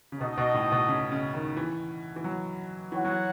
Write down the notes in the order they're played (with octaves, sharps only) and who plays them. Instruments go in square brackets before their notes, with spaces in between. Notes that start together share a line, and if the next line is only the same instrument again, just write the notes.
[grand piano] C#3
[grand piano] B2 [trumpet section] D#4 A4 D#5
[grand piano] B2
A2
B2
C#3
C#3
D#3
E3
E3
F#3
[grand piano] E3 [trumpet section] F#4 C#5 F#5
[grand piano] F#3